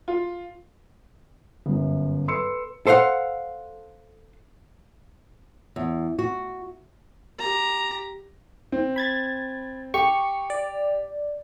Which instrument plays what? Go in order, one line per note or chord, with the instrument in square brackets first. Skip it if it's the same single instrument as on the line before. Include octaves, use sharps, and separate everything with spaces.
[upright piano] F4
[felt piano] G1 F#2
A4 B4 C6 E6 C#7
[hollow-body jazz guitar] A4 C5 D5 F5 F#5
[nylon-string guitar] E2
F#4
[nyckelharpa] G4 A#5
[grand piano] C4
[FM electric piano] B5 G#6 A6
[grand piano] G4 [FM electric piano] C#6
[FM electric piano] D5